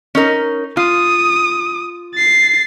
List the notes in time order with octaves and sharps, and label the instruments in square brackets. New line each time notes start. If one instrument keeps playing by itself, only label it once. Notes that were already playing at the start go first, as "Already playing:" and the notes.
[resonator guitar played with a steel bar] C#4 D#4 A#4
[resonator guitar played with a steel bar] F4 [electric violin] D#6
[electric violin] A6 C7